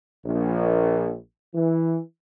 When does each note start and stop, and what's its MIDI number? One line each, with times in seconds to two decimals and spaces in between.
0.25 1.14 34
1.54 1.98 52